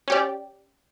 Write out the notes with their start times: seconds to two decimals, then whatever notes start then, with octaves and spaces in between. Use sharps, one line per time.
0.08 C#4 G4 D5